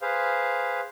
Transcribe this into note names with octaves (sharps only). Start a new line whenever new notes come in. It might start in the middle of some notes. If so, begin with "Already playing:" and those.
G#4 B4 C5 F5